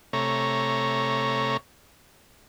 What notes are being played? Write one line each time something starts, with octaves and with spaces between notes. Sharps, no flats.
C3 A3 C#5 A#5